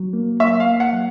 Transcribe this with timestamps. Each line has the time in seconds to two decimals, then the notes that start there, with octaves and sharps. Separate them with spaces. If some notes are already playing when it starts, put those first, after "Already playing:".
Already playing: F#3
0.13 A#3
0.40 A#3 E5
0.60 F5
0.67 A#3
0.80 F#5
0.93 F#3